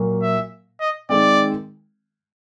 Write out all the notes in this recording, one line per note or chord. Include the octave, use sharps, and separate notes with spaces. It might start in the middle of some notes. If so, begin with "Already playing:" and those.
Already playing: A#2 F#3 A#3
E5
D#5
D#3 G#3 C4 D5